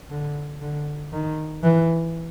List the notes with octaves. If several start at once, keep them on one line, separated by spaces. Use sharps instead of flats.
D3
D3
D#3
E3